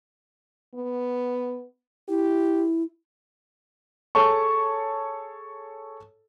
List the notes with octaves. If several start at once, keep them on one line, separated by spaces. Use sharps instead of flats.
B3
E4 G4
G#4 A4 C#5 A5 C#6